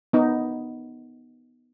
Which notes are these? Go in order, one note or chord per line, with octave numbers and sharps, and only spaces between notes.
B3 D#4